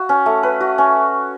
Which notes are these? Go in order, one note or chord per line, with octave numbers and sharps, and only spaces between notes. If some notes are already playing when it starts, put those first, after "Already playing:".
Already playing: F#4
C#4
A3
B4
F#4
C#4